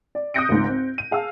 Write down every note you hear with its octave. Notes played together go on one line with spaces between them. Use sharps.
D5
D#6 F#6 G6 A#6 C#7 D7
G#1 C#2 G#2
C4
D#7
G#4 F5 A5 E6